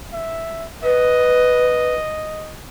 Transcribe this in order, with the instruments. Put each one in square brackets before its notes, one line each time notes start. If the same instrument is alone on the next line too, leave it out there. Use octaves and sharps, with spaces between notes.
[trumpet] E5
[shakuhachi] B4 [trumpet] D#5